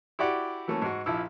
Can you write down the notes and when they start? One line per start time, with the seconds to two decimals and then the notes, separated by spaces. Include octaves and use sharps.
0.19 E4 F#4 G4 D5 F#5
0.68 E3 F#3 A3 A#3 C#4
0.82 G#2 F#4
1.06 A#1 F3 E4 E6